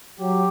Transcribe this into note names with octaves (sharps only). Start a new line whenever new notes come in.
F#3 G4